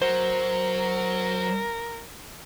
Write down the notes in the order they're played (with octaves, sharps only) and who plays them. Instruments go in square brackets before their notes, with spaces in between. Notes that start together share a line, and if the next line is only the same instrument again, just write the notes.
[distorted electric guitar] F#3 [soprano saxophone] A#4 [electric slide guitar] C5